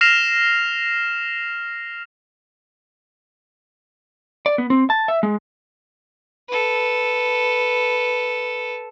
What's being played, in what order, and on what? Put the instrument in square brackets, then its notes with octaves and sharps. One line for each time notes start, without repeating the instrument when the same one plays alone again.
[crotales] F6 A#6 C7 E7 F7
[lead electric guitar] D5
B3
C4
A5
E5
G#3
[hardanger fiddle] A4 B4